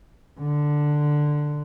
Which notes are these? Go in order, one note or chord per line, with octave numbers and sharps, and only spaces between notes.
D3